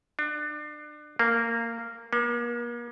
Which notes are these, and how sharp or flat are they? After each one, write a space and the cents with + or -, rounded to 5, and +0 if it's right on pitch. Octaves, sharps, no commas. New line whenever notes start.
D4 +30
A#3 -15
A#3 +40